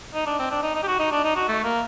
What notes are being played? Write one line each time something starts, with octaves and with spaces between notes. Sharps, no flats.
D#4
D4
C4
D4
D#4
D#4
G4
F#4
D#4
D4
D#4
F#4
A3
A#3